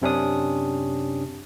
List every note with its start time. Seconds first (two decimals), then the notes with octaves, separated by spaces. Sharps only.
0.02 F#2 C3 C#4 D4 D#6